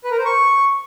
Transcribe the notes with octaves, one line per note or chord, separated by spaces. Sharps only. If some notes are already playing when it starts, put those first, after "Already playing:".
B4
A#4
C5
C#6